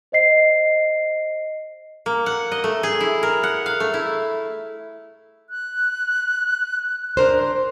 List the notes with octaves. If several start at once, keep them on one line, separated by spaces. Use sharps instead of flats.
C5 D#5 C7
A#3
F#5
D#5
A3
G#4
E4
A#4
F#5
F5
A3
E4
F#6
D4 A#4 C5